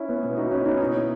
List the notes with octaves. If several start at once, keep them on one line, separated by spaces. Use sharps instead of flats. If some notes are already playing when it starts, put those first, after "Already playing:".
Already playing: C#4 E4
B3
B2 B3
D#4 F#4
C#4 E4
B3 D#4
B2 B3 D#4